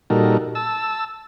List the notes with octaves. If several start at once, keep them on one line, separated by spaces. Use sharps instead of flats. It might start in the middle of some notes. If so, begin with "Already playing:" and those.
A#2 G3 D#4 F#4 A4 A#4
A5 E6